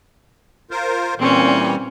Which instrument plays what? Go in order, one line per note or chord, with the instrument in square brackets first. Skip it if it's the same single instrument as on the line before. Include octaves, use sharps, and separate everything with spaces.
[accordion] F4 A#4 C5
[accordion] A#2 E3 G3 [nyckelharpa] C4 C#4